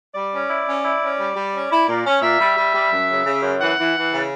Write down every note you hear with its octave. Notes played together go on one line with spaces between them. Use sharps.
G3 D5
C#4
E4
C#4
E4
C#4
G3
G3
C#4
E4
A#2
C#4
A#2 E5
G3
G3
G3
F#2
C#3
C#3
F#2
E3 F#5
E3
E3
C#3